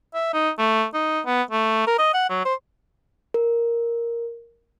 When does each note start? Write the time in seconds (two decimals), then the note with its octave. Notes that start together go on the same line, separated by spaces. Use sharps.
0.14 E5
0.34 D#4
0.59 A3
0.94 D#4
1.26 B3
1.51 A3
1.87 A#4
1.99 D#5
2.14 F#5
2.30 F#3
2.45 C5
3.34 A#4